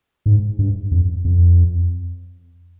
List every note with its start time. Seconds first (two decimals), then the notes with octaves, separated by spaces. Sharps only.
0.26 G#2
0.59 G2
0.91 F2
1.24 F2